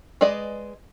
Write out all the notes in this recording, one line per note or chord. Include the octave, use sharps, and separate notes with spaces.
G#3 G#4 B4 D5 D#5